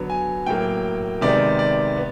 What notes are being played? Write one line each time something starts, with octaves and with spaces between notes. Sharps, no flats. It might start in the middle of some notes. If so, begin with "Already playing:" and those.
Already playing: D3 F#3 B3
G#5
A2 F#3 A#3 G5
C3 D#3 G#3 B3 D5
D5
B3